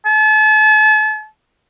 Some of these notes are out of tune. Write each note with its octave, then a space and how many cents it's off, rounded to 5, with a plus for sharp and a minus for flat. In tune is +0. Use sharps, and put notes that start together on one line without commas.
A5 -40